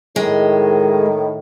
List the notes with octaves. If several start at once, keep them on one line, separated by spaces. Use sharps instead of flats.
A2 D#3 G#3